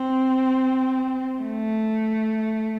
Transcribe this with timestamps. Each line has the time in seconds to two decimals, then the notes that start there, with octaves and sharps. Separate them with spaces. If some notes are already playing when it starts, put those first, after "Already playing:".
Already playing: C4
1.41 A3